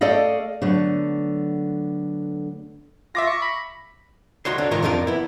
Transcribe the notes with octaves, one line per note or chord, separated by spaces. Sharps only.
A3 A4 D5 D#5 F5
D3 F#3 A3 B3
F4 E5 D6 A#6
C#6
B5
D2 D#4 F#4 C#5 C6
D3
G#2 D#3 F4 A#4 C#5 A#5
F2 D4 D#4 F4 A4 A#4
B3 E4